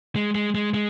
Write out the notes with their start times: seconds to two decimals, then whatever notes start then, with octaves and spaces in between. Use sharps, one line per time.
0.16 G#3
0.35 G#3
0.55 G#3
0.74 G#3